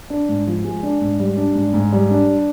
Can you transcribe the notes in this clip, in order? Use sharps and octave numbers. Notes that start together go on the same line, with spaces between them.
D4
G#2
F3
G#3
D4
G#2
G3
D4
G#2
G#2
G3
D4